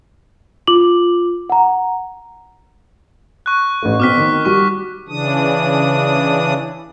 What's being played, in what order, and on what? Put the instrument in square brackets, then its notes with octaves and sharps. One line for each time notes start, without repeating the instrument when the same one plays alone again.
[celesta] F4 D6 F#7
F#5 A#5
[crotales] C#6 F#6
[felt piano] A1 A3
[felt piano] B2 C4 [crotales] D6 F6 B6
[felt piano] D#3
[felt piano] G3 F#4 [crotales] C#6
[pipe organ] C#3 E3 D4 D#6